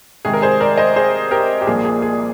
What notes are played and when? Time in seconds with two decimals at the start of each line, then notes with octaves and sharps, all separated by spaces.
0.25 C3 D#3 G#3 G#4
0.33 A#4
0.42 G#4 C5
0.61 A#4 D5
0.78 C5 D#5
0.96 G#4 C5
1.31 G4 A#4
1.61 G4
1.67 C2 A#2 F3 A#3 D4 G#4
1.85 G#4
2.02 G#4